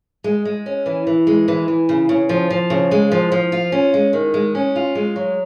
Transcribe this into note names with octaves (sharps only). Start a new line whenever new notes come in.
G#3
G#3
C#4
E3
E3
G#3
E3
E3
C#3
C#3
F3
F3
C#3
G#3
F3
F3
F4
C#4
G#3
D#3
G#3
C#4
F4
G#3
F#3